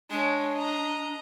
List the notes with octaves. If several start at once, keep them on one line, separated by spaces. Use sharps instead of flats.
G#3 D4 C#5
D#5 A#5